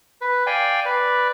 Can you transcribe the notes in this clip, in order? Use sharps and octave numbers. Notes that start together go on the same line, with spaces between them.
B4
D5 F5 G5 G#5
B4 D5